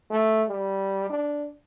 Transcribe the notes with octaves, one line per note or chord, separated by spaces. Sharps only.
A3
G3
D4